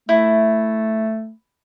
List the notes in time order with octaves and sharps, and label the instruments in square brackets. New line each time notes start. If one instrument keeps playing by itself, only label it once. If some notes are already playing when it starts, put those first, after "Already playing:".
[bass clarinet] A3 [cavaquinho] E4